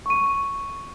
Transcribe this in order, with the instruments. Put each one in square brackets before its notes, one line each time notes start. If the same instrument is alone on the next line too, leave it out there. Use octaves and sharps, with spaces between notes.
[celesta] C#6 D#7